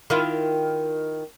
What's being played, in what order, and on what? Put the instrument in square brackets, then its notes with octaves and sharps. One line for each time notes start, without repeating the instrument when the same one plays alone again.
[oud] D#3 E4 F4